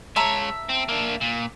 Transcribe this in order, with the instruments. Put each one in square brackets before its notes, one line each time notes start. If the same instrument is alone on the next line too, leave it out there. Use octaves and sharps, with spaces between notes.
[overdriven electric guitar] G#3 C#5 [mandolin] E5 A5 A#5
[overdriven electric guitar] C4
A#3 D4
A#2